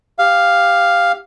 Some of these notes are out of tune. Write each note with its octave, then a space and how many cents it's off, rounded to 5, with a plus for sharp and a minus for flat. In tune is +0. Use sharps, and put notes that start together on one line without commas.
G4 +10 F5 +0